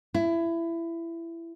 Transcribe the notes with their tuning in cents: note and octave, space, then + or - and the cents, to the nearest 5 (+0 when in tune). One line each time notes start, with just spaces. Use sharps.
E4 +20